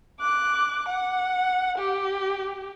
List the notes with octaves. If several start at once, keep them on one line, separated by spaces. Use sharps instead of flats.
D6 F#6
F#5
G4